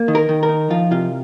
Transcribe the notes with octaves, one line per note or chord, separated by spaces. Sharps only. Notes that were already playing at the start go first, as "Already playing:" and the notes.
Already playing: A#3
D#3
A#4
D#3
A#4
D#4
F3 F4
C3 F4